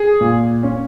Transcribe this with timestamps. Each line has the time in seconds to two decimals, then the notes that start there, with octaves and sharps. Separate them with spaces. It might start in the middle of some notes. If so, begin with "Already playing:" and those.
Already playing: G#4
0.21 A#2
0.63 C#4